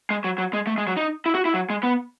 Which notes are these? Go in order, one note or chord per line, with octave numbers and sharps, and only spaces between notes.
G#3
F#3
F#3
G#3
A3
G#3
F#3
D#4
E4
F#4
E4
F#3
G#3
B3